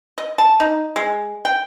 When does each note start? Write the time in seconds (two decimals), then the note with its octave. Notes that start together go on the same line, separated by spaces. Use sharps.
0.18 D#5
0.38 A5
0.60 D#4
0.96 G#3
1.45 G5